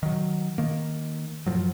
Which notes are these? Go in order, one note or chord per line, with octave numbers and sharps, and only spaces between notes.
D#3 F#3
D#3 A#3
F#2 A2 F3 F#3